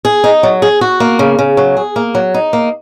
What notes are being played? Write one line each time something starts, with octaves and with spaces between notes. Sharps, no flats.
G#4
D#4
F#3
G#4
F#4
A#3
C#3
C#3
F#3
G#4
A#3
F#3
D#4
A#3